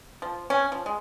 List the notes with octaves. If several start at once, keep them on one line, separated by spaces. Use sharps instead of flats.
F3
C#4
F3
G#3